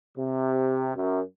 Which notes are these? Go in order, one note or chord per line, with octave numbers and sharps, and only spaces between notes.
C3
F#2